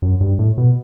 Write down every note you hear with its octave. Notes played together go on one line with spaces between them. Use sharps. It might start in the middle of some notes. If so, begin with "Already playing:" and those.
F#2
G2
A2
B2